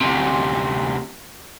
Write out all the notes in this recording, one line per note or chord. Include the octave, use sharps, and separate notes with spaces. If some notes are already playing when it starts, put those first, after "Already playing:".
D2 C3